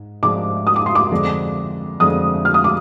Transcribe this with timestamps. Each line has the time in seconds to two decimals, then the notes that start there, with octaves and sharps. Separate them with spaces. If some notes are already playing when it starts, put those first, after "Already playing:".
Already playing: G#2
0.23 G#2 F3 G#3 D4 D6
0.67 D#6
0.76 D6
0.86 C6
0.95 D6
1.12 F2 D3 G#3 D4
2.00 F2 D3 G#3 D4 D#6
2.45 F6
2.54 D#6
2.64 D6